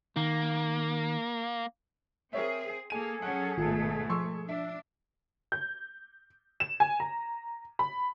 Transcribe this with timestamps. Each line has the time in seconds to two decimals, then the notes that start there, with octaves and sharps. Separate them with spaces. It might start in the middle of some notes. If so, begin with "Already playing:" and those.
0.16 D#3 A#3
2.33 C4 G#4 A#4 C#5 E5
2.90 A#3 G#4 A4 G#5 D#7
3.22 F#3 C#4 F#5
3.58 A1 G#2 B2 D#3 A3 F4
4.10 F3 C6 C#6 E6
4.49 D4 E5
5.52 G6
6.60 E7
6.80 G#5
7.00 A#5
7.79 B5